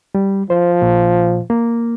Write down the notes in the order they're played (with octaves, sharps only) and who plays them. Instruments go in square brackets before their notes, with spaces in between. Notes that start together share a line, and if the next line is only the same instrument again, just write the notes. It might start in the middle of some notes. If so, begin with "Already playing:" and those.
[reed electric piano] G3
[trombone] F3 [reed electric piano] C5
[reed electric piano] A#2
A#3